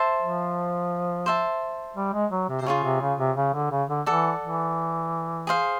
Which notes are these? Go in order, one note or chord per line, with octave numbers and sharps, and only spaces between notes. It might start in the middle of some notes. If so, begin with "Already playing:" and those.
Already playing: C5 E5 A5
F3
C5 E5 A5
G3
G#3
F#3
C3
C3
C#3 F4 G#4 C#5
C3
C#3
C3
C#3
D3
C#3
D3
E3 A4 D5 F#5
E3
G#4 C5 F5